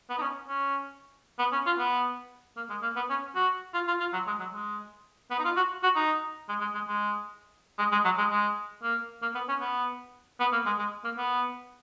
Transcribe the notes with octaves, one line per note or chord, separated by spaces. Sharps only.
B3
D#4
C#4
C#4
B3
C#4
F4
B3
A#3
G#3
A#3
B3
C#4
F#4
F4
F4
F4
F#3
G#3
F#3
G#3
B3
D#4
F4
F#4
F#4
D#4
G#3
G#3
G#3
G#3
G#3
G#3
F#3
G#3
G#3
A#3
A#3
B3
C#4
B3
B3
A#3
G#3
G#3
A#3
B3